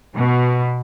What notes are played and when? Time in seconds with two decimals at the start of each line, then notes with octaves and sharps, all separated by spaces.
0.15 B2